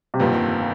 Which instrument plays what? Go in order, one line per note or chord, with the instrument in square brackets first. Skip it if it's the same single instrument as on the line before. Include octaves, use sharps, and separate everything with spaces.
[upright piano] C3
[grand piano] G1 F2 D#3 [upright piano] A#2